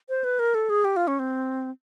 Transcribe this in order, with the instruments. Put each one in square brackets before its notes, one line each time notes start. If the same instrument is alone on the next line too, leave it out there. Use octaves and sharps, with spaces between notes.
[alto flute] C5
B4
A#4
A4
G#4
G4
F4
C#4
C4